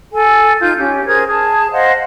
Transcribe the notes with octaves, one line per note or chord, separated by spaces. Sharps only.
A4 G#5
D#4 F4 G6
C#4 G4
G#4 A#4 C5 G#6
G#4 A5
C5 D#5 F5 F#5